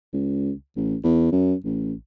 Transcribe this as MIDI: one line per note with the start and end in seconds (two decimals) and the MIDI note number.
0.13 0.52 37
0.76 0.96 33
1.04 1.29 40
1.32 1.54 42
1.65 1.93 33